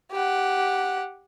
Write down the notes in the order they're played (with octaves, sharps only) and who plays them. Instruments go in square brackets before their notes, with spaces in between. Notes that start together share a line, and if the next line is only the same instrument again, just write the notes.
[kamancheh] G4 F#5